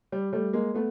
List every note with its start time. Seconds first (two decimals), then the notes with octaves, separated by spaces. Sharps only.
0.12 G3
0.33 G3 A3
0.53 G#3 A#3
0.74 A3 B3